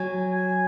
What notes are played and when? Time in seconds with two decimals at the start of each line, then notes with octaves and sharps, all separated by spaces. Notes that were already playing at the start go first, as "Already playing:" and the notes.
Already playing: F#3 G#5
0.33 G#5